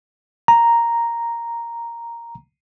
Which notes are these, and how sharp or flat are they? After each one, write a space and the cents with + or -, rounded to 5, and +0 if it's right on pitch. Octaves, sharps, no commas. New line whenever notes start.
A#5 +0